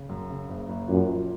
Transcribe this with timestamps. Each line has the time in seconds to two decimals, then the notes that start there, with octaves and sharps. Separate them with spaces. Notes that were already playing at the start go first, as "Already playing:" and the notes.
Already playing: C#3
0.09 F#2
0.30 C#3
0.49 F#1
0.69 F#1
0.88 F#2 A#2
1.08 F3